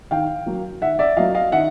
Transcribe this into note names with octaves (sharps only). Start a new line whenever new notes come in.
D#3 F5 G5
F#3 A#3
D#3 E5 F#5
D5 E5
F#3 A#3 D#5 F5
D#5 F5
D#3 E5 F#5